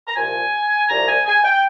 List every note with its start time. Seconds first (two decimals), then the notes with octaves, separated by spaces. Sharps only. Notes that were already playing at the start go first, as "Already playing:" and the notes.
0.07 A#5
0.16 C2 A#2 F3 G#5
0.89 C2 A#2 F3 A#5
1.08 G#5
1.26 G#5
1.44 G5